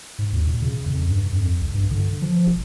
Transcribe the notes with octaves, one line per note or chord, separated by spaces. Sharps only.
G#2
D#2
A#2
C#3
F2
G2
F2
C2
G2
D3
F3
E1